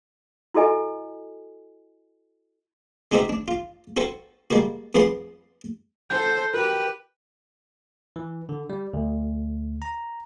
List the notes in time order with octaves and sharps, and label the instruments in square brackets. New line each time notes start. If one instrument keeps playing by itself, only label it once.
[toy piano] E4 F#4 A4 D#5 G#5
[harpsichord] G#3 D#4 F#4 G4 C5 E5
D4
F4
F#4 A4 C5 G5 C#6
G3 G#3 A#3 F#4
F2 G#4 B4 F#5 C6 D6
[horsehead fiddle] A4 C5 [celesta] G6
[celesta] F#4 A#4 [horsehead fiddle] G4 B4
[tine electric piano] E3
D3
G3
D2
A#5